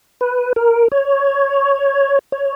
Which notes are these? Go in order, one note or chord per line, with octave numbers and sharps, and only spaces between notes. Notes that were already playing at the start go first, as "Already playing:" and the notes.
B4
A#4
C#5
C#5